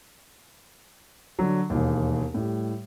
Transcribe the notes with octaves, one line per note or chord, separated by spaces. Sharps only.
D3 F#3
E1 D#2
A2 G3